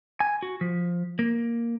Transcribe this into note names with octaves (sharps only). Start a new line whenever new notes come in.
G#5
F#4
F3
A#3